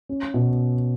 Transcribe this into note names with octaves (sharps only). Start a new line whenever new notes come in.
C#4
B2